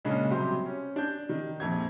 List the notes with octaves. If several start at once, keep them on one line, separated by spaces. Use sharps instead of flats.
A#2 C#3 G#3 C#4 D4
C3 F#3 G3 G4 C6
C#4
D4 G6
D#3
A#1 F2 G#6